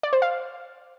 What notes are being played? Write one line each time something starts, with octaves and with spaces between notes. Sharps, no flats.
D5
C5
F5